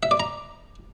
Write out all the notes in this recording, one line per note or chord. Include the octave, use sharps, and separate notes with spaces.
E5
D5
A#5